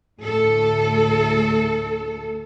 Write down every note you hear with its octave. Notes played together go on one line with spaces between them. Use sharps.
D2 A2 A4